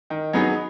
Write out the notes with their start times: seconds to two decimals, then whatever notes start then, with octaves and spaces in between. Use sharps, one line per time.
0.10 D#3
0.33 F#3 B3 D#4 G#4